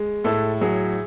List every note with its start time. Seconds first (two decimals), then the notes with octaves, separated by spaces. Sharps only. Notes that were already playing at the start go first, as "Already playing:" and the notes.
Already playing: G#3
0.24 A2 A4
0.61 F#3 G#4